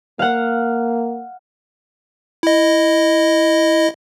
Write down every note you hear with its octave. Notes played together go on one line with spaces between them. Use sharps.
A#3 F5 F#5
E4 D#5